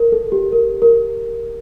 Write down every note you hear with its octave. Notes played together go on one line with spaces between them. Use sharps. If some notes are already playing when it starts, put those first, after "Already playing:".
Already playing: A#4
A4
G4
A#4
A#4